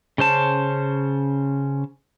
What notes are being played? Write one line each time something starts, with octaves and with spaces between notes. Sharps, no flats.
C#3 C#4 C5 A5